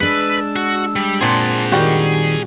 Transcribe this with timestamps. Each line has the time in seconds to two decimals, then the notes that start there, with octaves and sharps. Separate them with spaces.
0.01 G#3 D4 B4 E6
0.56 F#4
0.96 G3
1.21 A#2 C4 G#4 F#5 A5
1.72 D#3 G3 F#4 G4